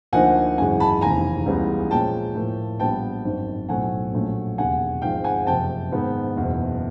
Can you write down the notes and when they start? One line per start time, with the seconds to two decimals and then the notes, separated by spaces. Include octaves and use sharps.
0.12 D2 D3 F3 A#3 D#4 F#5 G#5
0.58 G#1 F#2 C#3 E3 G#3 F#5 G#5
0.80 A5 B5
1.01 F1 D#2 C#3 E3 G#5 A#5
1.46 C#2 C#3 E3 G3 B3
1.91 A#2 F3 G#3 C#4 G5 A5
2.35 A2 F3 A#3
2.80 A#1 A#2 G3 B3 G5 A5
3.24 G#1 F#2 D#3
3.69 B1 A2 F#3 A3 C4 F#5 G#5
4.13 A#1 A#2 F#3 A3 C#4
4.57 E1 D#2 C#3 F#5 G#5
5.02 G#1 G#2 F3 G#3 F5 G5
5.24 F#5 G#5
5.47 F#1 F2 C3 G5 A5
5.91 G#2 D#3 G#3 B3 D#4
6.36 F#1 E2 B2